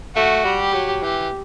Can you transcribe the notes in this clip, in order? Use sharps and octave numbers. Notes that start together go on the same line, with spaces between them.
A3 F#4
G3
G4
F#3
E3 G4